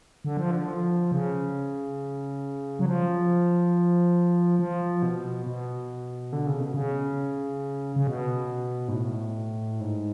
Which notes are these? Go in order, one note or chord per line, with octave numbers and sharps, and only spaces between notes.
D3
F3
D3
F3
C#3
F#3
F3
F3
B2
B2
D3
C#3
B2
C#3
C#3
B2
G#2
A2
G#2